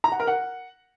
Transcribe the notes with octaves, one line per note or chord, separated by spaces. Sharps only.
A#5
F#5
A#4
F#5